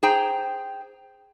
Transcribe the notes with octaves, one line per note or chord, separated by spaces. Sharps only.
G#4 C5 G5 A#5